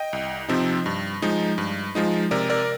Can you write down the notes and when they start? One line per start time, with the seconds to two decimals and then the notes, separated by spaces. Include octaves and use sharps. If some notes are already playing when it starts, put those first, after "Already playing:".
Already playing: D#5 G5
0.13 C2
0.49 C3 F3 C4 D#4
0.86 G2
1.22 F3 G#3 D#4
1.58 G2
1.95 F3 G#3 D#4
2.31 C3 A#4 D5
2.50 A#4 D5